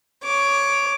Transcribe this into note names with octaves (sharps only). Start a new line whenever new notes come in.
C#5 D6